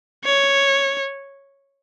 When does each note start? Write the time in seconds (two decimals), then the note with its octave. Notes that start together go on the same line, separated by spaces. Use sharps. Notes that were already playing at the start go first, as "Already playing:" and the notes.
0.25 C#5